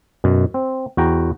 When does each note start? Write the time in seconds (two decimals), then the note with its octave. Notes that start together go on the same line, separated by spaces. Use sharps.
0.24 F#2 B2
0.54 C4
0.97 E2 F#4 G5 A#5